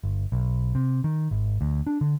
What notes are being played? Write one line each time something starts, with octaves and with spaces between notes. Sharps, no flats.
G1
B1
C3
D#3
G#1
D2
D4
D3